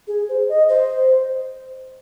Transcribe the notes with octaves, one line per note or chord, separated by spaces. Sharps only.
G#4
C5
D#5
C5